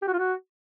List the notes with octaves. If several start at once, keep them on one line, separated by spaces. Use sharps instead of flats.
G4
F#4
F4
F#4